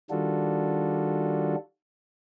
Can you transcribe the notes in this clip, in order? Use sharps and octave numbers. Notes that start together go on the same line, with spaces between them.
D#3 G3 D4 F4 F#4 A4